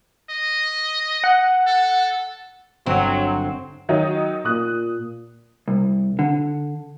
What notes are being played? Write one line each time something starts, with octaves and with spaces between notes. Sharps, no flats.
D#5
F#5
A4
G1 F#3 C4 F#5
D#3 F#3 D#4
A#2 D#6 F#6
C2
D3